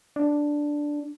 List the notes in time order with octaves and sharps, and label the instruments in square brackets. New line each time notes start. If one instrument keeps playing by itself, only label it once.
[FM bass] D4